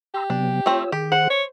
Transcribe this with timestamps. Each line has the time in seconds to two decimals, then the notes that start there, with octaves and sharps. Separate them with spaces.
0.14 G4 A#5 C6 E6
0.30 C3 F#3 B3 D4
0.66 A3 C4 F4 C#5 E6
0.92 D#3 G4 G#4
1.12 C5 F#5
1.30 C#5